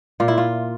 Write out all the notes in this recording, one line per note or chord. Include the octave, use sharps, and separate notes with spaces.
A#2 F4
E4
F4